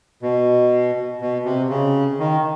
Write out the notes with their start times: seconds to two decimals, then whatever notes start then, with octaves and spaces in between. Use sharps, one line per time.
0.22 B2
1.21 B2
1.45 C3
1.70 C#3
2.19 D#3